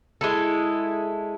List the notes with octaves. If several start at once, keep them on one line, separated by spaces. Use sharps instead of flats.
G#3 E4 A4